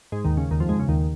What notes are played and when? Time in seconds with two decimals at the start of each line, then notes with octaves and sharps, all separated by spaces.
0.12 G#2 G#3
0.24 D#2 D#3
0.37 C#3
0.51 D#2 D#3
0.60 F2 F3
0.69 G#2 G#3
0.79 C#3
0.89 D#2 D#3